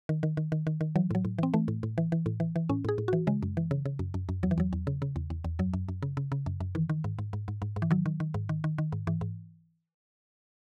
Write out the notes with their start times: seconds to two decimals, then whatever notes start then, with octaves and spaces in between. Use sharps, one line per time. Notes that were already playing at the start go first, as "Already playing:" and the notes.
0.09 D#3
0.23 D#3
0.37 D#3
0.52 D#3
0.67 D#3
0.81 D#3
0.96 E3 F#3
1.11 A2 F#3
1.25 A2
1.39 E3 C4
1.54 E3 A3
1.68 A2
1.83 A2
1.98 E3
2.12 E3
2.26 A2
2.40 E3
2.56 E3
2.69 A2 C#4
2.85 A2 G#4
2.98 A2
3.08 E3 F#4
3.27 C#3 G#3
3.43 F#2
3.57 E3
3.71 C#3
3.86 C#3
3.99 F#2
4.14 F#2
4.29 F#2
4.43 E2 F#3
4.51 E3
4.58 E2 F#3
4.73 E2
4.87 C#3
5.02 C#3
5.16 E2
5.30 E2
5.44 E2
5.59 F#2 F#3
5.74 F#2
5.89 F#2
6.03 C#3
6.17 C#3
6.32 C#3
6.46 F#2
6.61 F#2
6.75 D#3 E3
6.90 D#3
7.04 G#2
7.19 G#2
7.33 G#2
7.48 G#2
7.62 G#2
7.76 G#2
7.82 E3
7.91 D#3 F#3
8.06 D#3
8.20 D#3
8.34 G#2
8.49 D#3
8.64 D#3
8.78 D#3
8.92 G#2
9.07 G#2 E3
9.21 G#2